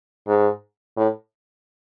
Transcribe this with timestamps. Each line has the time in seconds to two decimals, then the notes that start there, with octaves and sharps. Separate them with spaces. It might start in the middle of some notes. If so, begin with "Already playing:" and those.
0.28 G#2
0.97 A2